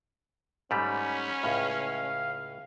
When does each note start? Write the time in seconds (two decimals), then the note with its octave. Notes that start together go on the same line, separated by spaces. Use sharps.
0.71 G#2 G3 A3 C#4 B5
1.44 C#2 A2 F5